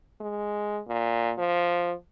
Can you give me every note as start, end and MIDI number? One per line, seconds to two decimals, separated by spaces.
0.21 0.80 56
0.88 1.33 46
1.38 1.93 53